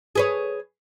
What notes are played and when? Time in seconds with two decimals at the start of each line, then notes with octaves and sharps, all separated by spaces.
0.15 G#4 B4 C#5